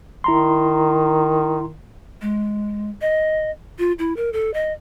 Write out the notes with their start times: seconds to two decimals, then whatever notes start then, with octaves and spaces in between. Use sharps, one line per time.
0.24 D#3 E4 A#5 C6
2.22 G#3
3.01 D#5
3.79 F4
3.99 E4
4.17 A#4
4.33 A4
4.54 D#5